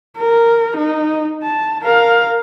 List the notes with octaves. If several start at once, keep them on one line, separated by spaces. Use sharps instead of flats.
A#4
D#4
A5
A#4 F5